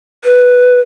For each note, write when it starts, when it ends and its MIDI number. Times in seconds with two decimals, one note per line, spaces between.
0.24 0.80 71